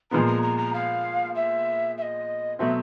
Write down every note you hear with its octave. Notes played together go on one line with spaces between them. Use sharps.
A#2 F3 G#3 B3 A#5
A#5
A#5
A#5
F5
E5
E5
D#5
B2 F#3 A3 C4 E5